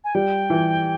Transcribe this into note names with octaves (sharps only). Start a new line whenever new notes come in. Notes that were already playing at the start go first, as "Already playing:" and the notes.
G#5
G3 G5
E3